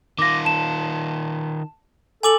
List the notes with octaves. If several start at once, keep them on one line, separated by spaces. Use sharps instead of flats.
D#3 F4 D6 A#6
A5 E7
A4 G#5 D6 F#7